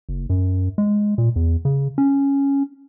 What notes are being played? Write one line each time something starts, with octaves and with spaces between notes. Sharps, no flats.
F#1
F#2
G#3
A#2
E2
C#3
C#4